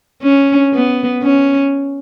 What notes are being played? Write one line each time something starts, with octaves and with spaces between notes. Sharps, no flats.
C#4
B3
C#4